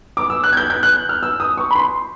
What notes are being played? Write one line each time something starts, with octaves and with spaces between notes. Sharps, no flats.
D6
E6
F#6
G#6
G6
G6
F#6
F6
E6
D#6
C#6
B5
C6